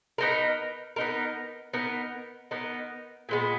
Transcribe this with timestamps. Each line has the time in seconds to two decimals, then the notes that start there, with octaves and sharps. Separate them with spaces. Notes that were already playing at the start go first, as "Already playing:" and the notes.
0.18 B3 D#4 A#4
0.96 B3 D#4 A#4
1.74 B3 D#4 A#4
2.51 B3 D#4 A#4
3.29 A#2 G#3 B3